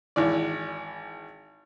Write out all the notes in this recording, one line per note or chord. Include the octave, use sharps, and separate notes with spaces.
G#1 E3 D5